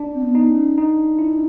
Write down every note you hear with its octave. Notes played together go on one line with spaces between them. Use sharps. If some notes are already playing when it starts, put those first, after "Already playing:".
Already playing: D4
C4
B3
D#4
C#4
D4 D#4
E4